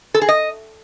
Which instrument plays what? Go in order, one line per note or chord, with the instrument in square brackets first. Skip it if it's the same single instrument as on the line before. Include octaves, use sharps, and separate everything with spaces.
[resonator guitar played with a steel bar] A4
G#4
D#5